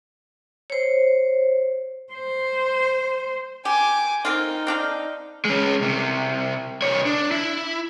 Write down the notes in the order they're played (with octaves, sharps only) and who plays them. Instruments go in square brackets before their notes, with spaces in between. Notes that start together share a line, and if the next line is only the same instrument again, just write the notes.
[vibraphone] C5 C#5
[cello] C5
[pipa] G4 [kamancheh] G#5 D6
[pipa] A#3 C4 F4 [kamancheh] D#4
[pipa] C4 D4 F5
[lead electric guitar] G#3 C#4
C2 C3
C2 C#5
D4
E4